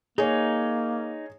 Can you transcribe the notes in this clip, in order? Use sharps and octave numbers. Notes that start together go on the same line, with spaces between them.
A#3 D#4 G#4 C#5